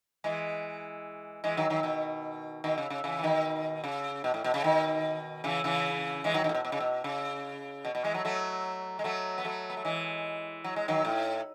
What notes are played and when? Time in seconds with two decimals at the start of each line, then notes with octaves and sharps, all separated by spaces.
0.24 E3 G#3
1.44 E3 G#3
1.57 D#3 F#3
1.70 D#3 F#3
1.83 B2 D#3
2.64 B2 D#3
2.78 C#3
2.90 C#3
3.04 C#3 E3
3.19 E3
3.23 B2 D#3
3.84 C#3
4.24 B2
4.34 A2
4.44 B2
4.54 C#3
4.64 B2 D#3
5.44 C#3 E3
5.64 C#3 E3
6.24 E3 G#3
6.34 D#3 F#3
6.44 B2 D#3
6.49 A2
6.54 B2
6.65 B2
6.72 C#3
6.80 B2
7.04 C#3
7.85 B2
7.95 B2
8.04 E3 G#3
8.14 F#3 A3
8.25 F#3 A3
8.99 G#3
9.04 F#3 A3
9.38 B3
9.44 F#3 A3
9.70 B3
9.77 A3
9.85 E3 G#3
10.64 F#3
10.76 G#3
10.88 D#3 F#3
11.05 A2